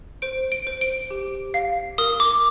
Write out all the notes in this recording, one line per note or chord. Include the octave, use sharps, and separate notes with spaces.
C5 D7
D7
C5
D7
G4
F5
A#4 D#6
D6